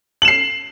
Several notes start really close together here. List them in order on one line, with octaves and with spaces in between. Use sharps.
F#7 E7 C7